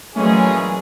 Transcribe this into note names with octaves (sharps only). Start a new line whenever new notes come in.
A#2 E3 F#3 G#3 A3 C#4 G#4